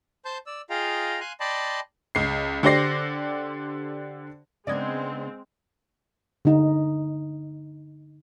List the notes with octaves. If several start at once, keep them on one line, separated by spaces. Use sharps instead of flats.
C5 A5 C6 G6
D5 E6
F4 G#4 D#5 F5 G5 A#5
F5 G#5 C6 F#6
D5 D#5 G5 A5 B5 C6
C#2 C7
D3 G4 C5 D5 A#6 C7
C#3 G#3 B3 C4 D4 D5 D#5 G#6
D3 D#4